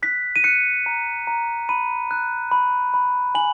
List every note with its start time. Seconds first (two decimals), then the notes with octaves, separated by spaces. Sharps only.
0.03 F#6 B6
0.36 D#7
0.44 F#6 C#7
0.86 A#5
1.27 A#5
1.69 B5 D#7
2.11 F#6
2.52 B5
2.94 B5
3.35 G#5 F#7